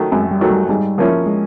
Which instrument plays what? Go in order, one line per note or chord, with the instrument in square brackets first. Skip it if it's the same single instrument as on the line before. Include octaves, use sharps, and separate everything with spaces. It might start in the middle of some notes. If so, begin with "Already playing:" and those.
Already playing: [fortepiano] D#3 F#3 A3
[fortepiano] F#2 [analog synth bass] G#3
[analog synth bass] G3
[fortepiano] D#3 F#3 A3
[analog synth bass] G3
[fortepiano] G#2 [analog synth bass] G3
[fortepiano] F3 A#3 C#4 E4
[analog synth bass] G#3